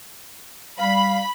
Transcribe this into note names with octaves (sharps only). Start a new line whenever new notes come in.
G3 F5 B5